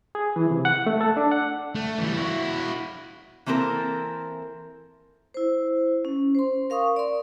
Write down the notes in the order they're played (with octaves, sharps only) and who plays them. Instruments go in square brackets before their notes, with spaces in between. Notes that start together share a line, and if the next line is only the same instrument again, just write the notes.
[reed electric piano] G#4
E3
C3
F#5
A3
A4
D4
F#5
[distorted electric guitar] A3
E3 G3
E4 F#4
[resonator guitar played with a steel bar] E3 A#3 C4 A4 A#4
[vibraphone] E4 C5
C#4
C5 C6
A#4 F5 C#6 D#6
D5 C6